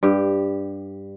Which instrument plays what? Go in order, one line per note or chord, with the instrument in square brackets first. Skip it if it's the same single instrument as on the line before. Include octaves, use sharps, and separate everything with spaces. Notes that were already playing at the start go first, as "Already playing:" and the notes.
[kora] G2 G4